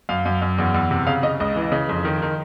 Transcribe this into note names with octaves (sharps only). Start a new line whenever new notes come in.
F#2 F5
F#2
F#2
E2
E2
C3
C#3 F5
C#3 D#5
C#2 D#5
E3
C#3
F2
D#3
D#3